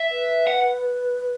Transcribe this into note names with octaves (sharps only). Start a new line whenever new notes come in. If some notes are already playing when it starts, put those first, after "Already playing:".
Already playing: E5
B4
F#5